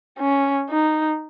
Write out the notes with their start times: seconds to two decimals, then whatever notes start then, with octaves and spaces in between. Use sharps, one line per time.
0.19 C#4
0.70 D#4